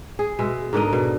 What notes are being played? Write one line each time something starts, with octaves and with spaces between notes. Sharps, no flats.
G#4
B2 G#3 E5
G#2 D3 A#4 D#5
B2